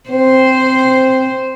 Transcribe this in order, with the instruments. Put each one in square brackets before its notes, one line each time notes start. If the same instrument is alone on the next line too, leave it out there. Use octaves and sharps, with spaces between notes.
[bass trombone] C4 [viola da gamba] C5